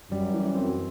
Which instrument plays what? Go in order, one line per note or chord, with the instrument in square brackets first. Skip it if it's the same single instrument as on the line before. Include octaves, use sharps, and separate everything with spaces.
[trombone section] F#2 [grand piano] G3
[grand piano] E3
C4